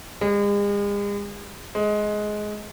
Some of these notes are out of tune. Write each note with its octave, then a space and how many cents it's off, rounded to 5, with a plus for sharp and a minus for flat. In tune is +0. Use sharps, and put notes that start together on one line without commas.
G#3 -40
G#3 +15